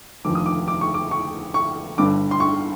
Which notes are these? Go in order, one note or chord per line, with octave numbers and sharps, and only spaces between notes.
F1 D#2 D3 F3 D6
D#6
D6
D6
C#6
D6
C#6
C#6
G1 G2 D3 D6
C6
C#6